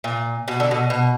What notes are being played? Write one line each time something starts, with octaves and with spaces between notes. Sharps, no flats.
A#2
B2
D3
B2
B2